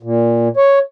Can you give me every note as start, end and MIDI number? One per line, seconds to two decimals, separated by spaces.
0.03 0.48 46
0.57 0.79 73